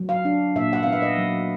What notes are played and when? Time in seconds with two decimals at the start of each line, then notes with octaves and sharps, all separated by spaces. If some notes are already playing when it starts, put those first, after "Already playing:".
Already playing: F#3
0.09 F5
0.25 D4
0.56 A#2 E5
0.73 F#5
0.83 B3 F5
0.92 E5
1.02 D#5
1.18 F#3